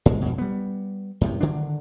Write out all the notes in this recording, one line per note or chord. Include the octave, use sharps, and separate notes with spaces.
G#2 G#3
F2 B2
G3 B3
F#2 A2 C3
D3 D#3 D4